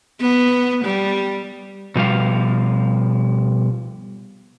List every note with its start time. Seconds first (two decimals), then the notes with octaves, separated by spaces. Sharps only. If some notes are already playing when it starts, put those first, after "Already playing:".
0.21 B3
0.85 G3
1.96 B2 F3 G3 F5